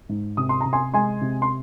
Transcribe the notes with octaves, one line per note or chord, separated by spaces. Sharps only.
G#2
C3 D#6
C6
A#5
C3
G#5 C6
G#3 G#5 C6
C3
C6